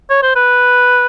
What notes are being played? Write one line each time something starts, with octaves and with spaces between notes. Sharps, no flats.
C#5
C5
B4